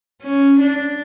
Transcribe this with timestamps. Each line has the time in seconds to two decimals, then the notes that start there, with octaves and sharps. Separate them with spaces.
0.23 C#4
0.60 D4